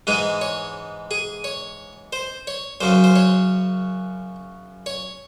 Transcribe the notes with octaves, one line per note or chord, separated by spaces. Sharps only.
G#2 E3 G#3 G#4
C#5
G#4
C#5
C5
C#5
F#2 C#3 F#3 C5
C5
C#5
C#5